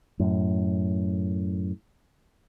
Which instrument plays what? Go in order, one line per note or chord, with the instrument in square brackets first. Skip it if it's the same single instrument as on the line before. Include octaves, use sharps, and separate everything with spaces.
[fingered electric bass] F#2 A2